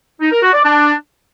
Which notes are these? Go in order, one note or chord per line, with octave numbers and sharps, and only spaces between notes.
D#4
A#4
F#4
D5
D4